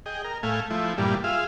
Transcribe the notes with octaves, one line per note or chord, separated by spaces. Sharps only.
G#4 D#5 G5
A#4
A2 A3 F5 G#5
F3 A3 E4
G2 A#2 E3 G3
F4 G#4 E5 F5